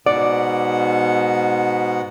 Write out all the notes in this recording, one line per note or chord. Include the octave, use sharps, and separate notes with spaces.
G#2 B2 D5 F#5